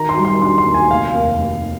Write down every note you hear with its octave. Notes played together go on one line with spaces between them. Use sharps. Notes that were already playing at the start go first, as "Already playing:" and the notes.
Already playing: D#3 A#5
C6
G3
C6
D4 C6
C6
D#2
G#5
F1 F5
D#2
D#2